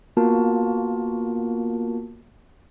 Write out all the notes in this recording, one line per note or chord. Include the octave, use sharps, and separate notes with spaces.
A#3 B3 F4 F#4 A#4 A5